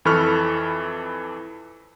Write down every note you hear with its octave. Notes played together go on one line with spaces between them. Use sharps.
F2 E3 A4 B5 C#6 F6